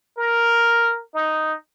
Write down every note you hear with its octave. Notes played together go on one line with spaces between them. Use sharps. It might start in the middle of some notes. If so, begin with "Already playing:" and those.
A#4
D#4